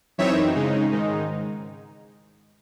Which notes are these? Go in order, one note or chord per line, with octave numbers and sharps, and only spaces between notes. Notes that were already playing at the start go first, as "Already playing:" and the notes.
F#2 E3 C4 D#4 C#5 E5
C#3 G#3 D#4
G#2 D#3 G#3 D#4